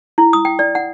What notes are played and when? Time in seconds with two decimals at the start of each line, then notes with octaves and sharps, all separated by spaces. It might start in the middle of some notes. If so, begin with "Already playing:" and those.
0.18 E4
0.33 D#6
0.45 G5
0.59 D5
0.75 F#5